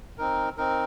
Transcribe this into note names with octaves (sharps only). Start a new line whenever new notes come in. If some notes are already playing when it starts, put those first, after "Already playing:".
C4 D#4 A#4
C4 D#4 A#4